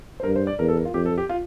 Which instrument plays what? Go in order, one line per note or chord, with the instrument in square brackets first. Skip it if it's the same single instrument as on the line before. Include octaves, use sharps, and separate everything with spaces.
[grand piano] C5
[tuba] G2 [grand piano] A#4
[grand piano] C5
D5
[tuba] E2 [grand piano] A#4
[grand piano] A4
A#4
F4
[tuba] F2 [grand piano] G4
[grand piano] A4
G4
F4